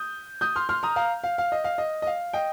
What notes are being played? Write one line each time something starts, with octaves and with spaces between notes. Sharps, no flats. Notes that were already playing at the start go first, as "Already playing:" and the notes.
Already playing: D#6 G6
D#6 G6
C6 F6
C6 F6
A#5 D#6
F5 A#5
F5
F5
D#5
F5
D#5
D#5
F5
D#5 G5